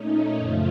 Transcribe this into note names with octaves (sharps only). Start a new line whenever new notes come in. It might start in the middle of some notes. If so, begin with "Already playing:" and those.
Already playing: A#2 A3 C#4 D#4
F#2 C#3 F3 A3 F4